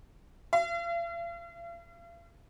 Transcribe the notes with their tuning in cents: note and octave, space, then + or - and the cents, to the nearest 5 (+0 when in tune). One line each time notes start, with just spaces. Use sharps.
F5 -45